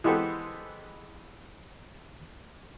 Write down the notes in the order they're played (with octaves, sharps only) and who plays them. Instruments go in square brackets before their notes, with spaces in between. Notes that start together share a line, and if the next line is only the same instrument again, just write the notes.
[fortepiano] E3 G#3 B3 G4 A4 C5